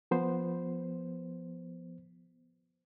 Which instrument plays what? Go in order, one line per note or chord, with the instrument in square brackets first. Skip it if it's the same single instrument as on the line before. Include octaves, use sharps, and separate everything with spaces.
[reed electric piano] F3 B3 C5